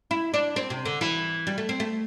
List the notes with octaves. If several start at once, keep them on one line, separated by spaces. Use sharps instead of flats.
E4
D4
C4
C3
D3
E3
G3
A3
C4
A3